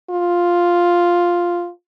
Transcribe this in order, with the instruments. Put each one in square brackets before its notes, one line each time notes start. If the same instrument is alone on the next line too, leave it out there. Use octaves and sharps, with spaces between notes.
[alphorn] F4